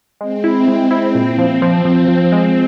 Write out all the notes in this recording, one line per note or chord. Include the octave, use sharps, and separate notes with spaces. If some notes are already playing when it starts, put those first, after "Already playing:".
G#3 C4
E4
G#3 C4
E4
A#2
F3
F3
F3
F3
G#3